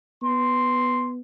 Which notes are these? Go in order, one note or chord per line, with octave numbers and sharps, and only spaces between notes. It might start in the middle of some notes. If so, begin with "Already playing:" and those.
B3 C6